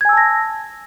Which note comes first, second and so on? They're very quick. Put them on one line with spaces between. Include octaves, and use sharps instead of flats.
G#6 G#5 E6 A5 A#6